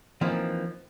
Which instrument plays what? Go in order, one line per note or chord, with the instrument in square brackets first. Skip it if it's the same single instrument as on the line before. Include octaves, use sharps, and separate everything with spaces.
[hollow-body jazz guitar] E3 F3 A#3 C4 D#4